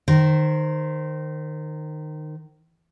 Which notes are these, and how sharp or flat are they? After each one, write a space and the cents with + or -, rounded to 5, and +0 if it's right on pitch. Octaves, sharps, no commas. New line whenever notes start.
D#3 -20 C5 +0